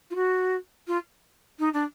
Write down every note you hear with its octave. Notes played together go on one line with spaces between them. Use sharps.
F4
F#4
F4
D#4
D4